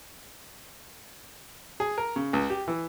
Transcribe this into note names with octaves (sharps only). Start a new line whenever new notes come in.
G#4
A#4
C#3
C#2
G4
E3